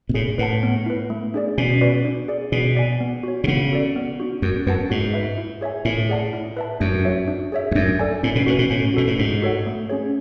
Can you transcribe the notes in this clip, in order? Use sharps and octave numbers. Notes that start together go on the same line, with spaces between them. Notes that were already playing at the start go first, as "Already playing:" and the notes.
B2
A2 G#4
A2 B4 F#5 A5
B3
E4 B4
A3
D4 G#4 D5
B2 C#4
F#4 B4 D5
D4
G#4 D5
B2 G#4
D5 G#5
B3
F#4 C#5
B2
C#3 B3
F#4 A4 D5
B3
D4 F#4
F#2 F#4
F#2 B4 F#5 A5
G#2 F#4
B4 E5
E4
G#4 C#5 E5 G#5
A2 E4
G#4 D5 F#5 A5
E4
B4 E5 A5
F#2 D4
F#4 C#5 E5
D4
G#4 C#5 E5
E2
F#2 D4
A4 D5 G#5
A2 C#4
B2
A2 F#4 B4
B2
A2 C#4
B2 F#4 A4
A2
G#2 D4
F#4 A4 C#5 F#5
A3
C#4 G#4 C#5